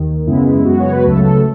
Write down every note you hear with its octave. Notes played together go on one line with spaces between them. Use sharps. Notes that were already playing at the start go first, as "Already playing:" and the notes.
Already playing: D#2 D#3
F#2 C#3 G#3 B3 E4
E4
F#2 C#3 G#3 B3 F#4
C#5
B4
C#2 C#3 F#3 A3 A4
A4